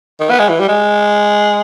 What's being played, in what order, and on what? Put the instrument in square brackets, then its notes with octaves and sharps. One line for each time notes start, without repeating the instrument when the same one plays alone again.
[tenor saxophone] D#3
B3
G#3
E3
G3
G#3